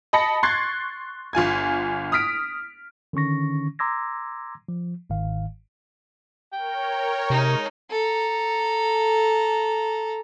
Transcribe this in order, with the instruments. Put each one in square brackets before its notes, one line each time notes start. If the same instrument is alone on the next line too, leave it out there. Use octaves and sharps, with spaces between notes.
[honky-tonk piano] D#5 A5 B5 A#6 C#7
C6 C#6 F#6 G#6 A6 C7
G1 F4 G#5 G#6
D#6 F6 B6 D7
[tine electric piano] D3 D#3 C#4 C#6 A#6
A#5 C6 D6 E6 G#6 A#6
F3
G1 G#2 D#3 F5
[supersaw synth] A#4 C#5 [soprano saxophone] G5
[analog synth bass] C3 [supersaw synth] G#3 [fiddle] D#4
[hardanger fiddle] A4 A#5